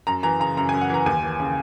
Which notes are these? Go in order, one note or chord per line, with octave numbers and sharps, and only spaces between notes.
F#2 A#5
E3 A#5
C#3 A#5
F#2 A#5
G#5
F#2
F#5
E3 A#5
D#2 G#5
E3
C#3